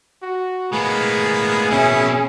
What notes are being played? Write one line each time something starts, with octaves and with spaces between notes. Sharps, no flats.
F#4
A2 G#3 A#3 B3 G#4 B5
B2 A#3 C#4 E4